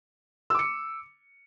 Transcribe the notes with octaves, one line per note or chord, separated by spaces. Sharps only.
D6 E6 C#7